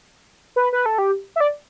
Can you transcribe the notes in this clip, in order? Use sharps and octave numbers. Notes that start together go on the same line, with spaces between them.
B4
B4
A4
G4
E5
D5